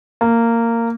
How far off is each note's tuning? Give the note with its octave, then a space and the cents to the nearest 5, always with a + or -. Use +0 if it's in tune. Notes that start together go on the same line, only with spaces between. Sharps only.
A#3 -15